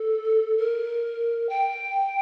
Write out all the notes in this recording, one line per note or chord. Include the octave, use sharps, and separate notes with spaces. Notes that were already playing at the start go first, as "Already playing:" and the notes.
Already playing: A4
A#4
G5